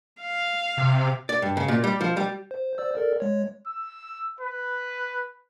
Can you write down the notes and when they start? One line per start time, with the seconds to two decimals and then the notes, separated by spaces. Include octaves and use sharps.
0.21 F5
0.77 C3
1.29 D5
1.42 G2
1.57 C#3
1.68 A#2
1.84 G3
2.01 F3
2.17 G3
2.51 C5
2.78 C5 D5 E6
2.95 A4 A#4 D5
3.20 G#3 C#5
3.67 E6
4.41 B4